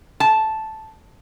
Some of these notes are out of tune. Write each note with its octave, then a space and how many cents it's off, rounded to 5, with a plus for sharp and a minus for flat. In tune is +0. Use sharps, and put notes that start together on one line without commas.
A5 -5